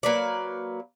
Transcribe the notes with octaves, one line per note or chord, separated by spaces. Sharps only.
F#3 A#3 B4 D5